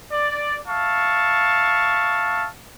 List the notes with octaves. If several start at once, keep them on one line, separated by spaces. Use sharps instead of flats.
D5
E5 F5 A5 C#6